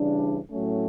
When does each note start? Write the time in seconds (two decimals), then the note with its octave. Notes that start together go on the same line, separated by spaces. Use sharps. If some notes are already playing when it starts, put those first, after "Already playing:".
Already playing: C#3 E3 G3 D4
0.50 A2 F#3 A3 C#4